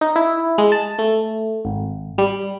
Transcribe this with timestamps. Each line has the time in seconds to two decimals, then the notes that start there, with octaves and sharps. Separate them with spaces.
0.01 D#4
0.16 E4
0.58 G#3
0.72 A5
0.99 A3
1.65 G#1
2.18 G3